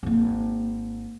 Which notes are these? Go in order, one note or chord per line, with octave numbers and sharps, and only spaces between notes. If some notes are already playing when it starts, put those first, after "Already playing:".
G#1 A#3